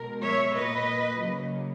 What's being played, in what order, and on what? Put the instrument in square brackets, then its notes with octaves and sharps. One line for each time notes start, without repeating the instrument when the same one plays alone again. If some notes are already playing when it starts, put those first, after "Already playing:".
Already playing: [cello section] B2 G#3 A#4
C#5 E5
A#2 A#3 B4 D#5
C#3 F#3 A#3